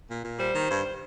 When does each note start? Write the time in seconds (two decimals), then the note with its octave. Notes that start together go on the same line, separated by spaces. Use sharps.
0.08 A#2
0.23 A#2
0.38 G3 C5
0.53 D#3
0.69 G2